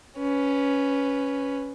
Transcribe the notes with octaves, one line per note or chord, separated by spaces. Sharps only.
C#4 B4